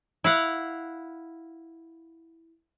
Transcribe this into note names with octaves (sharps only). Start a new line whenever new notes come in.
E4 F5 F#5